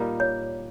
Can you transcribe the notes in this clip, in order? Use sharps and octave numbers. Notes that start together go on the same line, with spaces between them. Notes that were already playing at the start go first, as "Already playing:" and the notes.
Already playing: A#2 G3 A#3 D#4
C#5